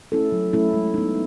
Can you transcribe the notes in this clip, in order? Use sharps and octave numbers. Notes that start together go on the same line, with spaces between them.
A3 C#4 E4 A4
F#3
A3 C#4 E4 A4
G#3
B3 D#4